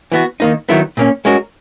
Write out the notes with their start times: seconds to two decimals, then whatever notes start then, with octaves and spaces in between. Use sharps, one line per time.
0.12 E3 B3 F#4
0.40 D#3 A#3 D#4
0.69 D#3 F#3 B3 E4 A#4
0.97 A#2 A#3 C#4
1.25 G#3 C#4 F#4 A#4